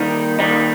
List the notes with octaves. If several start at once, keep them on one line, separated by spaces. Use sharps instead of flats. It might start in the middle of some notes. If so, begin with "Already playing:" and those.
Already playing: D#2 D#3 G3 D#4
D#2 D#3 G3 D#4